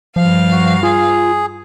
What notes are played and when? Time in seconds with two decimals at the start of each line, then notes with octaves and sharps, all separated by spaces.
0.16 G2 F3 F5
0.52 F#4
0.83 F4 G#4